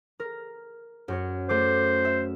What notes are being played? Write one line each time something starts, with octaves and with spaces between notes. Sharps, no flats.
A#4
F#2 F#4 C#5
A3 A4 C5 D6
E5